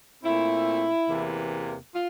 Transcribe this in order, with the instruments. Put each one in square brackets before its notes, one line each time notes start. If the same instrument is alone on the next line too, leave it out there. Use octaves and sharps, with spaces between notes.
[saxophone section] A#2 A3 C4 E4
E2 C3 E3 A#3
F4